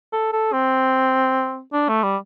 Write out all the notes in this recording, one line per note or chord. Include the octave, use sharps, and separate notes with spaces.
A4
A4
C4
D4
A3
G3